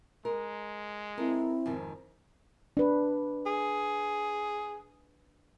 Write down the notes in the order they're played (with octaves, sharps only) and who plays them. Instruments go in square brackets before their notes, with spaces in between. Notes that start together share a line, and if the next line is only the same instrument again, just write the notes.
[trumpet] G#3 [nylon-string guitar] A#4
[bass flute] C4 [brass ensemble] E4 [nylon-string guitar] A4 A#4
[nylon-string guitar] F2 G#2 D#3
[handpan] D4 B4
[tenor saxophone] G#4